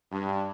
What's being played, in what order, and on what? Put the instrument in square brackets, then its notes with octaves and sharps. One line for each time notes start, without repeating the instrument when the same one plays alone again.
[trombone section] G2